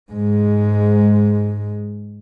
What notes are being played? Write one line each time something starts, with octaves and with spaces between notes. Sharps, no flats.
G#2 G#3